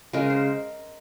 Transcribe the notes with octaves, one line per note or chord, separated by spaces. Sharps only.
C#3 G#3 A#4
C5